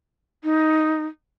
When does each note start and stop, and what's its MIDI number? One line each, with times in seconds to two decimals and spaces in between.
0.44 1.06 63